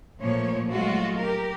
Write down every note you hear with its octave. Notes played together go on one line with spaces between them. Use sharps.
A#2 F3 A3 A#3 C#5
F#3 G#3 A3 F4 F#4
G4 A#4